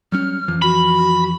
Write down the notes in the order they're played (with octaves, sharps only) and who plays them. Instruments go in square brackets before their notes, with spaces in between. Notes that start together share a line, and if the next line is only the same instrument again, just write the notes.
[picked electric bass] F#3 G3 C#4 [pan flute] F6
[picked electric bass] F2 E3 F3
[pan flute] F#4 [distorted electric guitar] B5